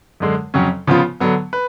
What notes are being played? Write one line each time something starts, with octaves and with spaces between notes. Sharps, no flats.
F#2 D3 G#3
F2 C#3 F#3 C#4
C#3 F3 B3 F4
D3 F#3 B3
B4